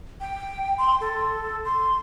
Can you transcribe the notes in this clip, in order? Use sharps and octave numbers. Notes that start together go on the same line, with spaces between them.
G5
C6
A4
C6